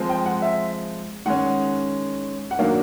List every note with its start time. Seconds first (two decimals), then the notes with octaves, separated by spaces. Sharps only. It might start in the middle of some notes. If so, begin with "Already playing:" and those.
Already playing: F3 G#3 C4
0.09 G5
0.26 F#5
0.42 E5
1.25 D#3 G#3 C#4 F#5
2.51 F#5
2.59 D#3 F#3 A#3 D4 F5